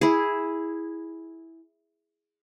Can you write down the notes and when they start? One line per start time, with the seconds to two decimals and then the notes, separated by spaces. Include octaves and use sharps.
0.01 E4 G#4